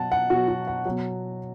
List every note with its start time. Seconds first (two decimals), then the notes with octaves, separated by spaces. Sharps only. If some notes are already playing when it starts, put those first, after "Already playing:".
Already playing: B2 F#3 F#5 A5
0.12 F#5
0.30 B2 F#3 F#4
0.48 F#4
0.68 F#5
0.86 B2 F#3